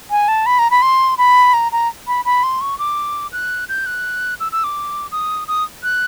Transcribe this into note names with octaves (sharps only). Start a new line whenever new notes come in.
G#5
A5
B5
A#5
B5
C6
B5
A#5
A#5
B5
B5
C6
C#6
D6
F#6
G6
F#6
E6
E6
D6
D#6
D#6
F#6